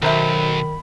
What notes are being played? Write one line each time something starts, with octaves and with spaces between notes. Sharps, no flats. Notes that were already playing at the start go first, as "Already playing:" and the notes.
B1 D#3 F#3 C5 E5 B5